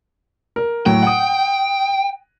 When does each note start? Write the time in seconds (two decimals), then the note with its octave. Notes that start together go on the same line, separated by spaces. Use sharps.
0.56 A#4
0.86 A2 F#3 G5
1.03 F#5 D#6